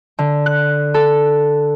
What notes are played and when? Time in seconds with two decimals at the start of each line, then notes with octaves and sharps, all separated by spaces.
0.19 D3
0.46 F#6
0.94 A4